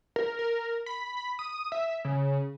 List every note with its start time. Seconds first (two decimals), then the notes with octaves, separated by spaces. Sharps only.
0.16 A#4
0.39 A#4
0.86 B5
1.17 B5
1.39 D#6
1.72 E5
2.05 C#3